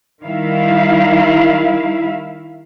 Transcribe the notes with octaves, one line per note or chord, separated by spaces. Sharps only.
D#3 G3 E4 E5 F5